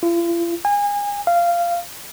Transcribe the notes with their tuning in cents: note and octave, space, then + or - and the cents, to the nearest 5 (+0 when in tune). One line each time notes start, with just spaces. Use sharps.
F4 -45
G#5 -30
F5 -15